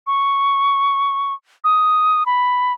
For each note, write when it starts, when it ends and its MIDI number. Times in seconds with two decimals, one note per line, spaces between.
0.07 1.33 85
1.64 2.23 87
2.26 2.73 83